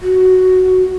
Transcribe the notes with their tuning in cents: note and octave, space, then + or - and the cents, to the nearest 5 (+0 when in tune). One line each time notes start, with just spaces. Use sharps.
F#4 +5